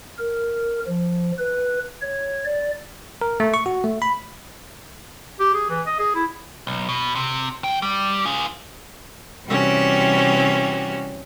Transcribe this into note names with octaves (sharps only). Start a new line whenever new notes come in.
A#4
F3
B4
C#5
D5
A#4
A3
C#6
F#4
A3
B5
G4
G#4
E3
D#5
G#4
E4
B1
B2
C3
D#2 G5
G3
F4 G#4
C3 E3 G3 C#4 F#4 G4